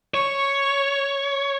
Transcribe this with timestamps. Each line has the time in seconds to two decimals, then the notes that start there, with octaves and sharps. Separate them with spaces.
0.14 C#5 C#6